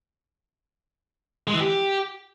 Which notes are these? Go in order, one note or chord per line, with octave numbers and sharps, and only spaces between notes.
G#3
E3
G4